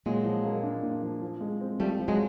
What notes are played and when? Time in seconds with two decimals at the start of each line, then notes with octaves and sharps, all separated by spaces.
0.06 A#2 F#3 G#3
0.25 F3
0.44 A#3
0.63 D4
0.83 A#2
1.02 F3
1.22 F3
1.41 G#3
1.61 C4
1.80 F3 G3 A3
2.00 F3
2.08 F#3 G#3